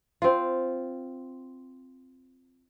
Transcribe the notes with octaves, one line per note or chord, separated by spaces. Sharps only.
C4 F4